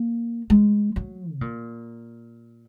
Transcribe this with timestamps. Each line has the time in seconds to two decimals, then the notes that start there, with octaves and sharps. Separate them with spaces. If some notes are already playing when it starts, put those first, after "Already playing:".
Already playing: A#3
0.50 G#3
0.96 F#3
1.33 C3
1.41 A#2